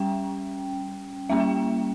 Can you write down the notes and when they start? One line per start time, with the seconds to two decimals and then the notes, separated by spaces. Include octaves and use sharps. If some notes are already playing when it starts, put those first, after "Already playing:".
Already playing: G3 C#4 G5
1.29 G3 A#3 C#4 E5
1.40 G5